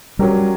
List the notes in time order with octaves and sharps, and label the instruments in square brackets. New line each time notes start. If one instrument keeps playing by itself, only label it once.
[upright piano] F#3 C#4 G4 A#4 [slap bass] G3